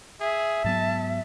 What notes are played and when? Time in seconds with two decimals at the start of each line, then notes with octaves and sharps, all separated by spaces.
0.20 G#4 E5
0.64 G#2 F#3 B3 A5